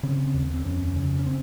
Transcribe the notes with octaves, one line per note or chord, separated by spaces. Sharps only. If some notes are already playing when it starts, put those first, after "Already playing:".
C#3 C4
D#2
C4
F2 C#4
C#3
C#4
C4